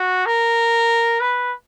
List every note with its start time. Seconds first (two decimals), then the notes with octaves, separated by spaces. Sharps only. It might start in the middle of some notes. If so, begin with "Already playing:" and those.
Already playing: F#4
0.26 A#4
1.20 B4